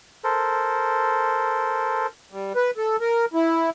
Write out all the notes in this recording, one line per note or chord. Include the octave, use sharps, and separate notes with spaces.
A4 A#4 C5
G3
B4
A4
A#4
E4